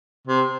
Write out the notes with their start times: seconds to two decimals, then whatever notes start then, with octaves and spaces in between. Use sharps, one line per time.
0.27 C3